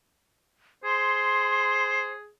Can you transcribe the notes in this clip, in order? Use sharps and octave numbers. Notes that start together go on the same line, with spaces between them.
G#4 C5 C6